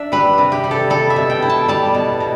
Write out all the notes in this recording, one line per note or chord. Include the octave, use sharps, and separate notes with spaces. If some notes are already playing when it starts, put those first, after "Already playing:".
Already playing: D4 D5 E5
G3 B4
C3
G4
G3
A4
G3 A4
E5
B2
G5
E4
A5
G3 A5
B2
B2